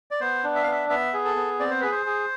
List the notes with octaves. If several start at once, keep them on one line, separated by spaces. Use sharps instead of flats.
D5
B3 C5
D4
E5
F5
B3
E5
B3 E5
G#4
A4
B3
C4 D5
C5
G#4 B4
C5
G#4